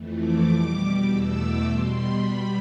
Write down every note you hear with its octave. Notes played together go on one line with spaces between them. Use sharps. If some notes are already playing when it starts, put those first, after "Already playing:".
Already playing: F2 E3 A3
D6
B2 G3
D6
E2 B2 A3 E6
D6
B2 G3 C6
B5
B2 G3